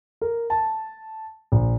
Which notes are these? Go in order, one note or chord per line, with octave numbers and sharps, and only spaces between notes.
A#4
A5
A#1